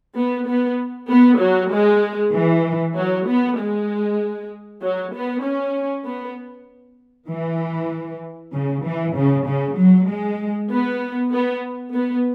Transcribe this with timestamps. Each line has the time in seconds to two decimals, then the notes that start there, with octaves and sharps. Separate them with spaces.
0.17 B3
0.48 B3
1.10 B3
1.41 F#3
1.73 G#3
2.34 E3
2.95 F#3
3.27 B3
3.58 G#3
4.81 F#3
5.13 B3
5.44 C#4
6.06 B3
7.29 E3
8.53 C#3
8.85 E3
9.16 C#3
9.47 C#3
9.77 F#3
10.08 G#3
10.70 B3
11.33 B3
11.94 B3